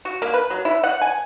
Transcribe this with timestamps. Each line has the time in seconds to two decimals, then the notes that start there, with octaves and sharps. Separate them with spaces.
0.05 F#4
0.22 A#3
0.34 B4
0.50 F#3
0.65 E4
0.84 F#5
1.01 G#5